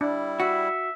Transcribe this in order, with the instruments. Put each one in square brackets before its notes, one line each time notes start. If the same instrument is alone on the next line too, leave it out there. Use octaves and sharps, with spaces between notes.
[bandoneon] G3 E4 [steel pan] D4
[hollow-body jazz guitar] F#4 [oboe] E5